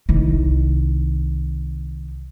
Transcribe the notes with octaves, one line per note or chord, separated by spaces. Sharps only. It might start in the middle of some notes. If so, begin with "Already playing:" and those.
C2 D#3